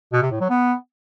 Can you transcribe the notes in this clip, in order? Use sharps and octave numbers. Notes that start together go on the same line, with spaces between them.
B2
C3
A2
F#3
B3